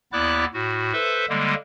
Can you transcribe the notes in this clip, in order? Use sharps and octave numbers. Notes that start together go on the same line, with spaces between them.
D#2 B3 E4 D5 D6 F#6
A2 F#4
A4 B4 C5 E5
D3 G3 G#3 A#3